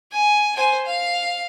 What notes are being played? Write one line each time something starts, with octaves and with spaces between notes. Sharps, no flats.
G#5
C5 G#5
F5